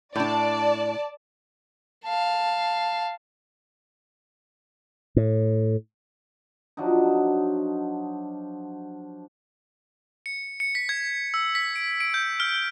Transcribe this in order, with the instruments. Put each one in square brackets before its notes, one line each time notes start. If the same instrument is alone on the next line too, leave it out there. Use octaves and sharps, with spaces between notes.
[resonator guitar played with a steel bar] A2 D4 [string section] D5 A5
[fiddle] F5 A5
[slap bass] A2
[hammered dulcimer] F3 F#3 D4 D#4
[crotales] C#7
C#7
B6
G#6
E6
B6
D7
D7
G6
F6